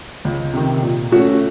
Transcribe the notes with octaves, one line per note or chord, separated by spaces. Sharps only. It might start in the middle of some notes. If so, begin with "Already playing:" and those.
C#2
C3 D#3
A#2
A3 C#4 F#4